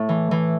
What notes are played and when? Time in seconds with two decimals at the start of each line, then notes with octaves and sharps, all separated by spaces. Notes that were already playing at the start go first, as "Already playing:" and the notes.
Already playing: A2
0.09 E3
0.31 E3